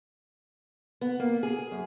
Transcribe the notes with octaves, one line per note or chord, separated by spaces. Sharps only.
B3
A#3
G#4
F#2